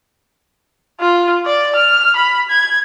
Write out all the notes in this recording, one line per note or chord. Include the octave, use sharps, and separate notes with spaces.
F4
D5
F6
B5
G#6